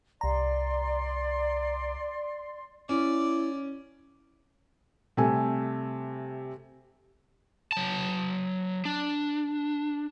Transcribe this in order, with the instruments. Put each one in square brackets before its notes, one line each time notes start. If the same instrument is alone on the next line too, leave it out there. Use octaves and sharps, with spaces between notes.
[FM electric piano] C2 A#5 [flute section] D5 C6
[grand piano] C#4 [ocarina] E4 [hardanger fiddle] D5
[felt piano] C3 G3 A3 G#5
[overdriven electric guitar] F#3 A5
D4